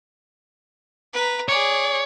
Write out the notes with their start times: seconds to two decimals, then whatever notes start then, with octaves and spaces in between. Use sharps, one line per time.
1.13 B4 A#5
1.49 G#4 C#5 D5